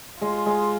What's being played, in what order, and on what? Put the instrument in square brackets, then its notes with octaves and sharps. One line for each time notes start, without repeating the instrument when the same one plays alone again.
[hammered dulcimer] G#3 [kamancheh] F4
[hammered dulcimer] G#3